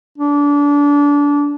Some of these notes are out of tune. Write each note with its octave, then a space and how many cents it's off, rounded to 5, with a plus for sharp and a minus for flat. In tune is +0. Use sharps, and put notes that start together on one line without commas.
D4 -25